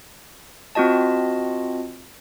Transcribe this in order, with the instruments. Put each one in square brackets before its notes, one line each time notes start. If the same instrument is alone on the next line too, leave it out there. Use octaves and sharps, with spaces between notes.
[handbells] C4 F4 F#4 D#5 A5